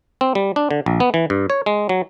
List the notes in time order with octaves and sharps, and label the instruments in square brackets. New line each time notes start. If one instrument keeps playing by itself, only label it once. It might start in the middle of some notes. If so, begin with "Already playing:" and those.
[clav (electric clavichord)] C4
G3
D4
D3
A#1
B3
E3
G2
C#5
G#3
F#3